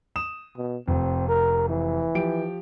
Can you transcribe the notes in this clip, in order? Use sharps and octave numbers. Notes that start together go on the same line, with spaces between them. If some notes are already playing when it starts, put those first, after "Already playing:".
D#6 E7
B2
F1 C4
A#4
E3
F3 G4 D7